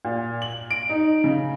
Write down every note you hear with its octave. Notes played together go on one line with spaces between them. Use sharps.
A#2
F#7
D7
D#4
C#3